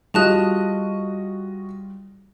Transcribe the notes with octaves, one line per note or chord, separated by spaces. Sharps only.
G3 F4 F#4 G#4 D#5 A5 F#6